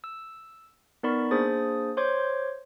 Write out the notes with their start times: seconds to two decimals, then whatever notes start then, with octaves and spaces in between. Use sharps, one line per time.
0.04 E6
1.03 B3 D#4 A#4 D5 B5 C#6
1.31 A#3 D4 G#4 C5 D#6 A6
1.97 C5 C#5 C6 D6 G6 G#6